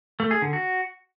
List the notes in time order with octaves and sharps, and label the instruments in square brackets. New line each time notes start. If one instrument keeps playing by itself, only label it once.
[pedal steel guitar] A3
G#4
D3
F#4